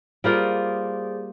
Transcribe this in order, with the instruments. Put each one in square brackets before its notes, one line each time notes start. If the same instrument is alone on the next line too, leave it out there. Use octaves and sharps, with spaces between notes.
[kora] G3 A#3 F4 [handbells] G#4 C5 D5